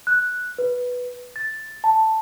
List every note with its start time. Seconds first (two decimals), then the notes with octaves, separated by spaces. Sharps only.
0.07 F#6
0.58 B4
1.36 A6
1.84 A5